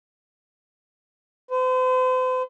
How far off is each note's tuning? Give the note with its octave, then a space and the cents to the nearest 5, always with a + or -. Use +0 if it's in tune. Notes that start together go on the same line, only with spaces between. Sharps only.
C5 -40